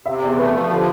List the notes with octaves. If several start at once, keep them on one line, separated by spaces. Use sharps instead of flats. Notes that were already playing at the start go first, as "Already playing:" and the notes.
C3 E5
E2 D5
A3 B4
F3 A4
D3 G4